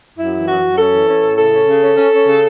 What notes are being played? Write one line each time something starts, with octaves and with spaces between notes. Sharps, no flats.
F#2 E4
E3
F#2 F#4
F#2
C#4 A4
E3
C#4
A2
C#3 A4
C#4
C#3
C#4
C#4
C#4
C#3